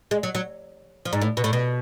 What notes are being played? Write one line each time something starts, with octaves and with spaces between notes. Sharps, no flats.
G#3
F#3
F#3
F3
G#2
A2
B2
A2
B2